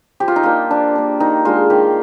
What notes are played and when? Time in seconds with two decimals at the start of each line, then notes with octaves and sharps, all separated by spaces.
0.20 F3 G4
0.28 F4
0.36 D#4
0.43 A#3 D4 F4
0.70 F3 D4
0.95 A#3 D4
1.20 D#3 D#4
1.45 G#3 D4 F4
1.70 D#3 G4